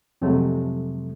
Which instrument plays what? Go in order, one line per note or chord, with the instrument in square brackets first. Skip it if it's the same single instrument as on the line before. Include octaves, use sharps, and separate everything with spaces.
[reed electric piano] F2 C3 F#3 G#3 A3